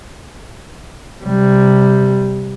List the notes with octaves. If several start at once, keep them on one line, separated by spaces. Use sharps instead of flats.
C3 G3